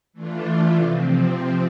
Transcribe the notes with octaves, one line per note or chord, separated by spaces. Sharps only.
E3 A3 D4 F4
C3 F3 C4